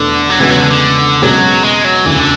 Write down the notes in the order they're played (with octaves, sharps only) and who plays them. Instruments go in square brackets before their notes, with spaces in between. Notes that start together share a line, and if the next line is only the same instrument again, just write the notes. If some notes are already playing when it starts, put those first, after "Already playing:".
Already playing: [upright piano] E2 B2 A3 D4 [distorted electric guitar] D3
[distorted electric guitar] F#3
[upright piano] E2 C#3 G#3 B3 F#4 [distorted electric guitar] E3
[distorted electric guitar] F#3
D3
D3
[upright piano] B2 G#3 C#4 G#4 [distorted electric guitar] F#3
[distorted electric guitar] G#3
F#3
[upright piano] E1 D2 C#3 [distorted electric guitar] E3
[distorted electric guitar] D3